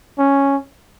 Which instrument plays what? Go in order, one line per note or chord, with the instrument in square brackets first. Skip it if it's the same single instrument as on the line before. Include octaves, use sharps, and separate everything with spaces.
[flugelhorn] C#4